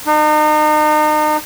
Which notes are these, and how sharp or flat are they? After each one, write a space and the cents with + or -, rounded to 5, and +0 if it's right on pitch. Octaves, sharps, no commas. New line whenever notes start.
D#4 -35